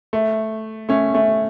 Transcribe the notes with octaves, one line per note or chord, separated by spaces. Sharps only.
A3
A3 C#4
A3 C#4